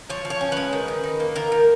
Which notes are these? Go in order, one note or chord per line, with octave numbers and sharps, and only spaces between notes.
F3 C#5
F3
C#5
C#4
G#3 B4
D#3
D#3
D#4
A#3
D#3 A#4
D#3